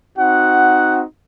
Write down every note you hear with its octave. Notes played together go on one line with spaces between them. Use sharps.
C4 D#4 F#4 F#5